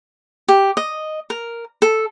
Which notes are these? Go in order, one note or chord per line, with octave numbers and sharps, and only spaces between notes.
G4
D#5
A#4
A4